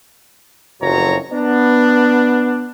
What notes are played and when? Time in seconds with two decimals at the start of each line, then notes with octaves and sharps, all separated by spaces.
0.81 F#1 F2 A#2 F#3 C#5 A#5
1.33 B3 D4